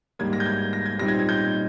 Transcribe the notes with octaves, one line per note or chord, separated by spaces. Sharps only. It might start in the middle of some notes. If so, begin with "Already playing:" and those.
G#2 G3 A#3 G#6
A#6
G6
G#6
A#6
G#6
A#2 G3 C4 D#4 A#6
G#6
G#6
G6